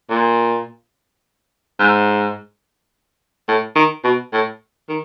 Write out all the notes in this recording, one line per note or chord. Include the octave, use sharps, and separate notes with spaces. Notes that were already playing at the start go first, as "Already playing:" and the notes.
A#2
G#2
A2
D#3
B2
A2
D#3